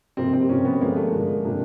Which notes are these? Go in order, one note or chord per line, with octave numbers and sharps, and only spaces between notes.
C3 F3 A#3 C4
C4
C3 F3 A#3 C#4
B3
D3 F3 G#3 A#3
A3
D3 F3 G#3
C3 F3 A#3 D4